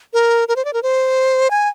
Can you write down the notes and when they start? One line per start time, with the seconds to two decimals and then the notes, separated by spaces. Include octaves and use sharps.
0.13 A#4
0.48 A#4
0.56 C5
0.65 D5
0.73 A#4
0.83 C5
1.50 G#5